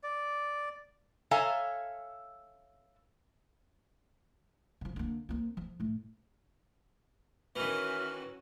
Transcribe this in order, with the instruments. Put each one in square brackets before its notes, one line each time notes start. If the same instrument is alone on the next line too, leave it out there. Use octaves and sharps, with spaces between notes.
[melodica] D5
[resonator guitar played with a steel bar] A4 C#5 E5 F5 G#5 A#5
[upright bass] C#3 F3
D3 A#3
A#3 C4
F3
A2 A3
[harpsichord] D#3 E3 [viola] C#4 F#4 [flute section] E5 G#5 F6